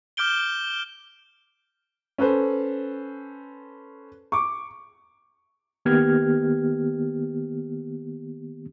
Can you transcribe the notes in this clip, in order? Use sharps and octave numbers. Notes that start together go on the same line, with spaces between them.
D6 F6 G6 D7 G7
C#4 A4 B4 C5
C#6 D6
D#3 A#3 B3 G4 F6 G#6